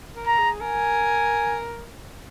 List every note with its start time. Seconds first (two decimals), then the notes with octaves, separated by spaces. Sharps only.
0.15 A#4
0.26 A#5
0.38 G#4
0.61 A#4 G#5